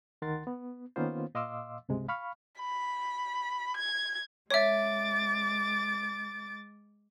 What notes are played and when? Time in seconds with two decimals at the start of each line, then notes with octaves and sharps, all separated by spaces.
0.22 D2 D#3 A#4 F#5 C6 A6
0.47 B3
0.96 D#3 A#3 B3 C#4 F4 C5
1.35 A#2 D#5 F5 C6 D6 E6
1.89 C#2 G2 C3 G#3
2.08 F5 B5 C#6 F6
2.60 B5
3.76 G#6
4.50 G#3 C#5 E5 D6 A6